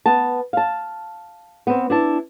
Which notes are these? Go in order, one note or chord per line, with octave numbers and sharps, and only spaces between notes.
B3 A5
F5 A5
B3 C4
D4 E4 A5